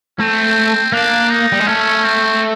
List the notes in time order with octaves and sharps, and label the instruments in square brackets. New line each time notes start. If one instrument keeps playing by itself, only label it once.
[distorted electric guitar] A3 [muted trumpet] C4
[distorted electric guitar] A#3 [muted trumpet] D4
[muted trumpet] D#4
[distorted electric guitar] G3
G#3
[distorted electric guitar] A3 [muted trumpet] C#4
[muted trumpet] C4